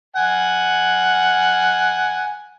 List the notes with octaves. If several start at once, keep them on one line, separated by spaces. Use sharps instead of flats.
F#5 G#5